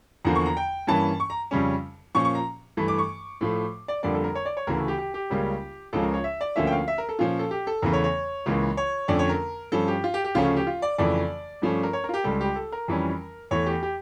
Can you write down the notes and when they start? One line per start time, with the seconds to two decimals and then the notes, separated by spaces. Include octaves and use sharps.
0.25 E2 D3 F3 A#3 A#5
0.35 C#6
0.46 A#5
0.57 G5
0.87 G2 E3 A#3 C#4 A5
1.20 C#6
1.30 A#5
1.51 F2 C#3 G3 C#4
2.15 A#2 F3 A#3 C#4 C#6
2.25 C#6
2.35 A#5
2.77 G2 E3 A3
2.88 D6
2.98 C#6
3.41 A2 F3 A3
3.88 D5
4.03 F2 D3 G3 A#3 D5
4.15 A4
4.24 A#4
4.35 C#5
4.46 D5
4.57 C#5
4.67 D2 C#3 E3 A3 A#4
4.77 A4
4.88 G4
4.98 G4
5.14 G4
5.30 C#2 C#3 G3 A#3 C#4
5.93 C#2 C#3 F3 C#4 A4
6.03 A#4
6.14 C#5
6.24 E5
6.41 D5
6.56 D2 D3 F3 A#3 C#4 E5
6.67 G5
6.72 F5
6.88 E5
6.98 A#4
7.09 A4
7.19 A#2 F3 C#4 F4
7.39 A4
7.51 G4
7.67 A4
7.82 E2 C#3 E3 A3 A#4
7.93 C#5
8.04 C#5
8.46 C#2 C#3 E3 A#3
8.77 C#5
9.08 F2 D3 A3 C#4 D5
9.19 C#5
9.29 A#4
9.72 G2 F3 C#4 A4
9.88 G4
10.04 F4
10.14 G4
10.24 G4
10.35 D2 C#3 F3 A3 C#4 F4
10.56 G4
10.67 F4
10.82 D5
10.98 F2 C#3 E3 A3 D5
11.62 G2 F3 A3 C#4
11.83 A#4
11.93 C#5
12.04 A#4
12.09 F4
12.14 G4
12.24 C#2 C#3 G3 A4
12.41 G4
12.56 A4
12.72 A#4
12.88 F2 E3 G3 C#4
13.51 E2 E3 A3 C#5
13.66 G4
13.83 G4